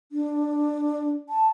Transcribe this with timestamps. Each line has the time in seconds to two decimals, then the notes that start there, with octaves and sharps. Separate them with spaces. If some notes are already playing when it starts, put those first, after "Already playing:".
0.12 D4
1.29 A5